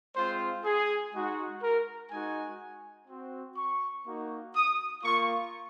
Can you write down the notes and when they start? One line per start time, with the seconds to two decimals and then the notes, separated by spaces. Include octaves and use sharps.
0.16 G#3 C4 F4 C5
0.64 G#4
1.13 G#3 D#4 F#4
1.62 A#4
2.11 G#3 D#4 F#4 G#5
3.08 C4 F#4
3.57 C#6
4.05 A#3 D#4 F#4
4.55 D#6
5.03 A#3 F4 C#6